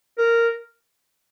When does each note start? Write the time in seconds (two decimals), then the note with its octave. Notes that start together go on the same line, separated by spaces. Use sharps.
0.18 A#4